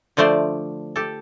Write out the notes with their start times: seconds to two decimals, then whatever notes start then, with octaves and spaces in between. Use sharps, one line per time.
0.17 D3 F3 A3 C5 D5
0.96 G4 A4